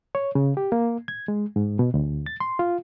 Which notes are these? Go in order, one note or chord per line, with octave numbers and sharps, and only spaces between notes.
C#5
C#3
G4
A#3
G#6
G#3
G#2
B2
D2
A6
C6
F4